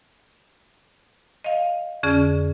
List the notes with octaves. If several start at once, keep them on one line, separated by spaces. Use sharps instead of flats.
D#5 F5
F2 D3 C#4 G#4 D5 F6